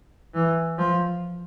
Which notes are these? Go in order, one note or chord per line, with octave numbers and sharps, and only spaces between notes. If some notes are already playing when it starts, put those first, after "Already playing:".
E3
F3